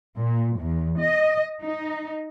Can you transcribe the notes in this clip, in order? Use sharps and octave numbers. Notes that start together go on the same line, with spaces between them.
A#2
E2
D#5
D#4